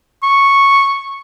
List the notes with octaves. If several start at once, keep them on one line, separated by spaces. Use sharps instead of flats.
C#6